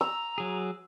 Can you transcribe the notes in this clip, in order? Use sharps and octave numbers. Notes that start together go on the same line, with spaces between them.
A#5 E6
F#3 G#4